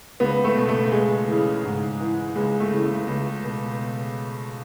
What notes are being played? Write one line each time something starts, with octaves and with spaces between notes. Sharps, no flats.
C#2 B3
A3
B2
A3
C#2 G#3
C#3 E3
G#2
E3
C#2 G#3
A3
C#3 E3
A3
C#2
B2